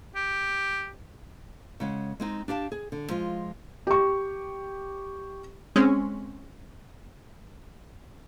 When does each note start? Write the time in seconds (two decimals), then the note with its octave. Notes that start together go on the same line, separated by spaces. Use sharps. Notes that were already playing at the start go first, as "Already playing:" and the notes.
0.15 G4
1.80 C#3 G#3 F#5
2.20 G#3 C4 D#4
2.48 D4 G4 F5 A5
2.72 G#4
2.92 D3
3.09 F3 G#3 F4
3.87 G4 C#6
5.76 G#3 C4 C#4